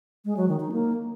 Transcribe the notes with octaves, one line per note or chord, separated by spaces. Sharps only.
G#3
F#3
D#3
D#4
A#3